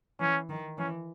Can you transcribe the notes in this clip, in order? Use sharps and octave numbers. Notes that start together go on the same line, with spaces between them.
E3 C#4
D#3
E3 C#4